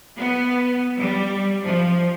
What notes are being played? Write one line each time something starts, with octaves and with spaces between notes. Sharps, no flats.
B3
G3
F3